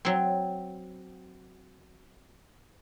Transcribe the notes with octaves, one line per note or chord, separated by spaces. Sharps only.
F#3 C4